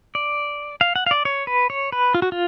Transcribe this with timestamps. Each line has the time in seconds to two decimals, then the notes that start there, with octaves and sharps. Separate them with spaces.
0.15 D5
0.81 F5
0.96 F#5
1.06 F5
1.11 D5
1.25 C#5
1.47 B4
1.70 C#5
1.92 B4
2.14 F4
2.22 F#4
2.32 F4